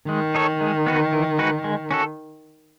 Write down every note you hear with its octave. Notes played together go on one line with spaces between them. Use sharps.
D#3 G#3
D#4 A4 C#5
G#3
B3 F#4 B4
E3
G#3 D#4 F#4 B4
G#3
C#4 F#4 A4